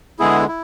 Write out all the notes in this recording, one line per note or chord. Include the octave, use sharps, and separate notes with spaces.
D3 G#3 B3 E4 G#4
E4